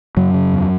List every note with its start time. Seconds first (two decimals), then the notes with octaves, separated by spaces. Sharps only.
0.17 F#2 C#3 F#3
0.34 C#3
0.53 E2